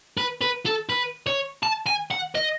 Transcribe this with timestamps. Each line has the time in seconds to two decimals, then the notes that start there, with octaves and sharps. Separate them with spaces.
0.17 B4
0.41 B4
0.66 A4
0.89 B4
1.27 C#5
1.63 A5
1.87 G#5
2.11 F#5
2.35 D#5